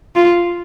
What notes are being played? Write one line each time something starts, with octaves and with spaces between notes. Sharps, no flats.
F4